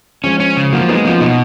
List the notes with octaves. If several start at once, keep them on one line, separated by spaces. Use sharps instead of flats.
F3 G#3 C#4
C#4
C#3
F3 F#3 A#3
G#3 B3 D#4
F3 C#4 F4
B2 D#4 F#4